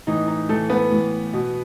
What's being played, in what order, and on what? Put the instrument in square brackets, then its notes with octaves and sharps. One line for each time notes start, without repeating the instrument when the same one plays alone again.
[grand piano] A2 E3 D#4
D#4
A2 E3 A3 A4
B3 B4
A2 E3
B2